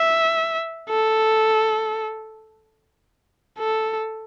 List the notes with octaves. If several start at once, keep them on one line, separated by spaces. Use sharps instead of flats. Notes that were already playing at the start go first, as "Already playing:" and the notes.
Already playing: E5
A4
A4